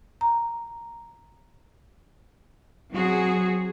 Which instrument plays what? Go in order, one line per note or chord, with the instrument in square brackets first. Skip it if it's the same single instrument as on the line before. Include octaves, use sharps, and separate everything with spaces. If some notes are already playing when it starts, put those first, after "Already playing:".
[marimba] A#5
[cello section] F#3 C4 F#4 G#4